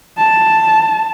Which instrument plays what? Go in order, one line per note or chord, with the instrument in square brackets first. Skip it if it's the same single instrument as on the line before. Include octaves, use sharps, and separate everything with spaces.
[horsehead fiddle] A5